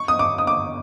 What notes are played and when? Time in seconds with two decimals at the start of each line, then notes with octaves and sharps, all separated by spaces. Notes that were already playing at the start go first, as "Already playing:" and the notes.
Already playing: C#6
0.08 D#6
0.19 D6
0.38 D#6
0.47 D6